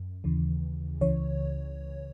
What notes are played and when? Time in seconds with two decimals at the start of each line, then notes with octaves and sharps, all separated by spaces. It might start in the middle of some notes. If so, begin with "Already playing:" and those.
Already playing: F#2
0.24 D#2 C#3 E3
1.01 C#2 C#3 E3 C#5